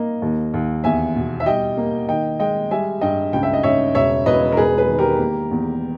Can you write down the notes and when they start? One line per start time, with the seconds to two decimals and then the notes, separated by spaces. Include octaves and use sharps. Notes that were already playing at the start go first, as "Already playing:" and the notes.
Already playing: A#3 D#5
0.22 D#2
0.54 D#2
0.84 E2 E5 G#5
1.16 B2
1.40 E5
1.46 G3 D#5 G5
1.77 A#3
2.08 D#3 D#5 G5
2.39 G#3 D#5 G5
2.71 G3 E5 G#5
3.01 G2 D#5 G5
3.33 C#2 G5
3.43 E5
3.53 D#5
3.63 C#2 C#5 E5
3.95 E1 C#5 E5
4.26 E1 B4 D#5
4.52 A#4
4.57 E1 G#4 B4
4.78 G#4 B4
4.89 D#3
4.99 G4 A#4
5.19 A#3
5.51 E2